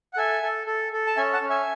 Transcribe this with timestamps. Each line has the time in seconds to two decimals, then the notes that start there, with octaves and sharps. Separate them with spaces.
0.13 F#5
0.17 A4 E5 G#5
0.43 A4
0.67 A4
0.93 A4
1.07 A5
1.17 C#4 E5 G#5
1.33 F#5 A5
1.42 C#4
1.49 E5 G#5